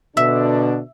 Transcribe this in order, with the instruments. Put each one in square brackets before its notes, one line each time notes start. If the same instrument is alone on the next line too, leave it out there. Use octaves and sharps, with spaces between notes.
[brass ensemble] B2 D3 D4 [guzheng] E5